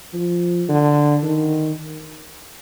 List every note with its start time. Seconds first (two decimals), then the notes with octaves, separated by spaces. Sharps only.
0.14 F3
0.68 D3
1.23 D#3